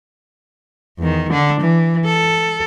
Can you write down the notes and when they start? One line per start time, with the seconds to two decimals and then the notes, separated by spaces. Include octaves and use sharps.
0.99 E2 D#3
1.30 D3 D4
1.60 E3
2.05 A4